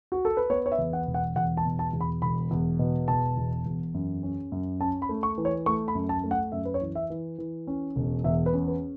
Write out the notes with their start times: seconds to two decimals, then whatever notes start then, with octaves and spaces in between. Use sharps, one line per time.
0.12 F#4
0.25 A4
0.37 B4
0.50 B3 C#5
0.66 C#5
0.72 E5
0.78 E2
0.93 F#5
1.07 E1
1.14 F#5
1.36 E2 F#5
1.57 A5
1.65 B2
1.79 A5
1.93 E2
2.01 B5
2.22 E1 B5
2.51 E2
2.79 B2
3.08 E1 A5
3.37 E2
3.66 E2
3.94 F#2
4.23 C#4
4.52 F#2
4.80 C#4 A5
5.02 B5
5.09 A3
5.23 C#6
5.38 E3
5.45 C#5
5.66 A3 C#6
5.88 B5
5.95 F#2
6.09 A5
6.24 A3
6.31 F#5
6.52 F#2 E5
6.65 B4
6.74 C#5
6.81 E3
6.95 E5
7.10 E3
7.38 E3
7.67 C#4
7.96 E1
8.24 E2 E5
8.46 B4
8.53 C#4
8.68 B4